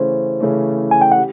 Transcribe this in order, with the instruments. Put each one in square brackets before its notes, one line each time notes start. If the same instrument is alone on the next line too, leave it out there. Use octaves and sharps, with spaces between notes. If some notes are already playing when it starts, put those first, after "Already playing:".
Already playing: [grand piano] C#3 E3 A3 C#4 [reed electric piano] C5
[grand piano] C#3 E3 A3 C#4
[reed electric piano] G#5
G5
F#5
[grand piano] G4